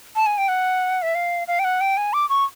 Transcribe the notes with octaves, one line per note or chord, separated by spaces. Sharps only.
A5
G#5
G5
F#5
E5
F5
F5
G5
F#5
G5
G#5
D6
C#6